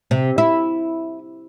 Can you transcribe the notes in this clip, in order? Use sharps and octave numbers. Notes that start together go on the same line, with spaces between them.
C3
E4